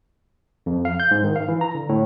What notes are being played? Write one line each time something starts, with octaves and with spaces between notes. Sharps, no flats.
F2
F5
G6
G#2
D#3
F5
E3
A#5
D3
A2